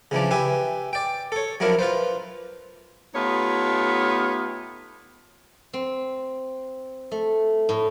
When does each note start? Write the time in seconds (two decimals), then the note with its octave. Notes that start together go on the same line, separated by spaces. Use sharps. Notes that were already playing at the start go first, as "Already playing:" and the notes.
0.11 C#3 E3 F3 D4
0.31 G4 B4 E5 G#5
0.93 D5 G5
1.32 A4 C#5
1.60 F3 F#3 D4 E4 A#4
1.79 F4 B4 C5
3.15 A3 B3 D#4 F4 G4 C#5
5.73 C4
7.11 A3
7.69 A2